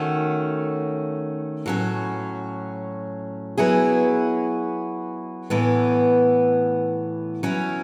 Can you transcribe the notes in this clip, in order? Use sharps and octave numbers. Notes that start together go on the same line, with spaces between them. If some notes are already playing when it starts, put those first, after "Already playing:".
Already playing: D#3 A3 C#4 F#4
A2 F#3 C#4
F#3 B3 E4 G#4
A2 E3 B3
F#3 C#4 E4